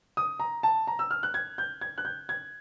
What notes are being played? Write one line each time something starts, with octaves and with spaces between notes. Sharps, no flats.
D#6
A#5
A5
A#5
E6
F6
F#6
G#6
G6
G#6
F#6
G6
G#6